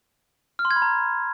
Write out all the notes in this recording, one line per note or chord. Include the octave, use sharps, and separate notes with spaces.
F6
C6
G#6
B5
A#5